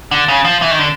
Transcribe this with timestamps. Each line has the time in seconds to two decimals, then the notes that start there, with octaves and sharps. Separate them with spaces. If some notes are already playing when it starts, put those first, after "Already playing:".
0.11 D3
0.28 C#3
0.45 F3
0.62 E3
0.71 D#3
0.79 D3